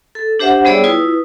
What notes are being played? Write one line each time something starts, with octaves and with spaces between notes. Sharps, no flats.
A4
D4 G4 C5 E5 F#5
G3 B3 G#4 C#5 D5 E6
E4 F4 B4 D#6